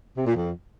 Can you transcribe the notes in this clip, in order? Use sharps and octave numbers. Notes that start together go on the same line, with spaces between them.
C3
A#2
F2